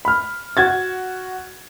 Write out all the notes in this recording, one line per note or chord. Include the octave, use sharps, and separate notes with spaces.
B5 F6
F#4 G#6 A6